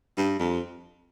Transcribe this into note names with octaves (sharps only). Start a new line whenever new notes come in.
G2
F2